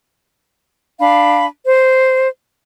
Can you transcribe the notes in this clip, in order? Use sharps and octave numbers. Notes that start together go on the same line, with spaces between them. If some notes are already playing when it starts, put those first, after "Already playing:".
D4 F5 B5
C5